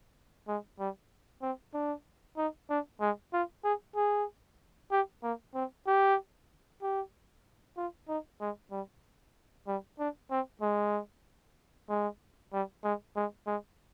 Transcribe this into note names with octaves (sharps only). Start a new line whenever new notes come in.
G#3
G3
C4
D4
D#4
D4
G#3
F4
G#4
G#4
G4
A#3
C4
G4
G4
F4
D#4
G#3
G3
G3
D4
C4
G#3
G#3
G3
G#3
G#3
G#3